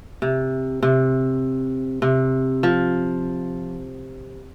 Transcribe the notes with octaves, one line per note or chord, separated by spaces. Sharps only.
C3
C3
C3
F3